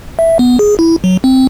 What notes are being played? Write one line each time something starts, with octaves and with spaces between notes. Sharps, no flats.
E5
B3
G#4
E4
F#3
C4